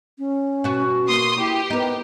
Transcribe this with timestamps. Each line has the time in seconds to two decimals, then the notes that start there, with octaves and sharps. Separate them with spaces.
0.19 C#4
0.64 B2 F#4
1.08 A#3 C6 D#6
1.38 E4 G4
1.70 B3 D#4 A#4